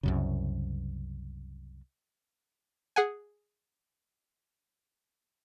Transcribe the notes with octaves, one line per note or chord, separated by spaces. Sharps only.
C2 F#2 C#3
G#4 F#5 G#5